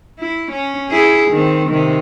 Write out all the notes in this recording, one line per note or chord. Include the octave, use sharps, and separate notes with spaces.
E4
C#4
E4 G#4
D#3 C4
C3 D#3